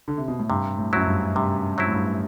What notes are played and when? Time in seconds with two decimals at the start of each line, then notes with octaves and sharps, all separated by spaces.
0.08 D3
0.18 C3
0.28 B2
0.39 A2
0.50 G2 C3
0.78 A2
0.93 F#2 F#3 C4 E4
1.07 G2
1.35 G2 C3
1.78 F#3 C4 E4
1.87 A2
1.93 G2